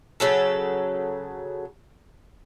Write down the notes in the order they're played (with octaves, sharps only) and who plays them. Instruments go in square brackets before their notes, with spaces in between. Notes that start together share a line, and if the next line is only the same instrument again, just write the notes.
[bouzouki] C#3 F#3 A4